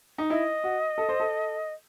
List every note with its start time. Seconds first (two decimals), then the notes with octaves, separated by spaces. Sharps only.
0.18 D#4
0.30 E4 D#5
0.64 F#4
0.98 A4
1.09 C5
1.20 A4